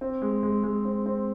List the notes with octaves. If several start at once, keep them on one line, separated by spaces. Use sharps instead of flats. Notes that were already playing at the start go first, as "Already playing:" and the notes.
C4
G#3
G#3
G#3
C4
C4